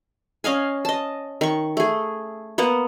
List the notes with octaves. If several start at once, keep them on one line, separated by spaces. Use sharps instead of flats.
C#4 D#5 F5 G#5
D#5 A5
D#3 C#6
A3 G#4
A#3 B3 F#5